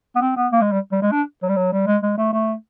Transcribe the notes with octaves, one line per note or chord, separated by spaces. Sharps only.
B3
C4
B3
A#3
G#3
G3
G3
G#3
D4
F#3
G3
F#3
G3
G#3
G#3
A3
A3